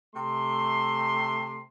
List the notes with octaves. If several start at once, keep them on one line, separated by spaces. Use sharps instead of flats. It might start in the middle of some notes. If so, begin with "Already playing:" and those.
C3 A3 C6